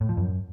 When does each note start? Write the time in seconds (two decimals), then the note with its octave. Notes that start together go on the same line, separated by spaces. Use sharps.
0.01 A2
0.09 F3
0.17 F#2